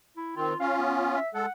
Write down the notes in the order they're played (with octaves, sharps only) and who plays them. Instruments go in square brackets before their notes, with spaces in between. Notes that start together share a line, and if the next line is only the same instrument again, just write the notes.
[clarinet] E4
[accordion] D#3 C4 [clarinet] F4
[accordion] C#4 F4 [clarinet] F5
[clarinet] B3
E5
[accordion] G#3 A4 [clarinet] F#5